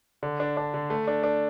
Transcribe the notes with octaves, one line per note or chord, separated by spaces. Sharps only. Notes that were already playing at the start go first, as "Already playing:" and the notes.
D3
D4
D4
D3
A3
D4
D4